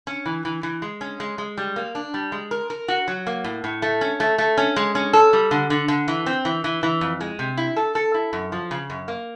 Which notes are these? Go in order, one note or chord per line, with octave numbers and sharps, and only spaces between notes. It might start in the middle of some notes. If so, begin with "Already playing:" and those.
C#4
E3
E3
E3
G#3
C#4
G#3
G#3
G3
A#3
D4
G3
G#3
A#4
A#4
F#4
F#3
A#3
A2
A2
A3
C#4
A3
A3
C#4
G#3
C#4
A4
G3
D3
D3
D3
E3
C4
E3
E3
E3
F2
G#3
C3
E4
A4
A4
E4
F#2
F3
C#3
F#2
A#3